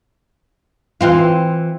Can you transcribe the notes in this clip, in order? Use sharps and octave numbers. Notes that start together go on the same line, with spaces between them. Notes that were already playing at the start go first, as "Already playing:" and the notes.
E3 C4 F4